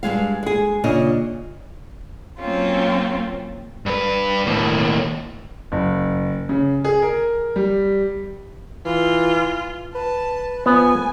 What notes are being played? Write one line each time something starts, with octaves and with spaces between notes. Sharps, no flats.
G2 C#3 G#3 F5
G#3 G#4
A#2 C#3 D4 D#5
F#3 A#3 C4 C#4 F4
G2 B4
D#2 A2
F#1
C#3
G#4
A#4
G3
E3 F4
B4 A5
F3 B3 G#5